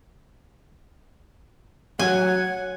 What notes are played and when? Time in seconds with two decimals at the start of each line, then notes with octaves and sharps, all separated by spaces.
1.99 F#3 F#5 G#5